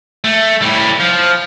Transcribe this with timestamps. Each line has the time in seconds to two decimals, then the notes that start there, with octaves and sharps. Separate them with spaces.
0.24 A3
0.62 A2 G3
1.00 F3